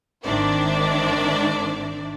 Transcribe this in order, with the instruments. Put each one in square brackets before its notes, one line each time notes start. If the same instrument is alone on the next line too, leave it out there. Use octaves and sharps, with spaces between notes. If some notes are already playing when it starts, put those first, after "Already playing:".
[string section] G#1 D#3 D4 C5 D5 E5